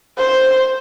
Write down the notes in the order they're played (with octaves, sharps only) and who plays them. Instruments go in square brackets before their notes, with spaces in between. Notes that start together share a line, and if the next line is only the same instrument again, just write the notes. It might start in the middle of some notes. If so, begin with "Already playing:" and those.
[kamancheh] C5